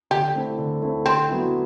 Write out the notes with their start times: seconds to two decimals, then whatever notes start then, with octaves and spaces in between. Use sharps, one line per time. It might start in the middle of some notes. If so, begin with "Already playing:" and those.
0.11 D3 G4
0.35 A3 C4 E4
0.58 D3
0.82 A3 C4 E4
1.05 D3 C4
1.29 F#3 B3 E4